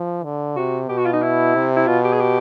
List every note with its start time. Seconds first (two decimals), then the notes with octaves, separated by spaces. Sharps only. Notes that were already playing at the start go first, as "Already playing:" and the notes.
Already playing: F3
0.24 D3
0.56 C3 F#4
0.89 B2 G4
0.97 F#4
1.06 F4
1.13 D#4
1.22 E4
1.55 C3
1.77 E4
1.87 B2 F4
2.04 G4
2.13 G#4
2.20 G4